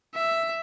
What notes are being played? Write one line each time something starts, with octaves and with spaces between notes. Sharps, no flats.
E5